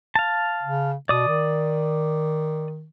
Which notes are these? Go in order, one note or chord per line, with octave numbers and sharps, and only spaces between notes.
F5 A5
C#3
B2 D5 D#6
D#3